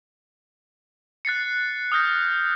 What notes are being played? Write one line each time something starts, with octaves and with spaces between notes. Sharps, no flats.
F#6 A6 C7 C#7
D#6 F6 G6 A#6